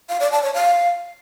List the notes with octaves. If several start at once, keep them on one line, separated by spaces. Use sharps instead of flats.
F5
D5
A5
C#5
F5